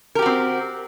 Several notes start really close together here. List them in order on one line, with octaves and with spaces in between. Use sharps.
A#4 G4 F#4 C4